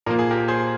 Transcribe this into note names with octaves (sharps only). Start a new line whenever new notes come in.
A#2 F3 A#3 A#4
G#4
G4 A#4
G#4 C5